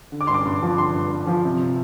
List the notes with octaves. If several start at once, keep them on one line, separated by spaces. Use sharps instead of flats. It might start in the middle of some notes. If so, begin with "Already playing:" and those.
D3
D6
G2 C6
D6
G2
F3
D3 C6
G2
G2
F3
C3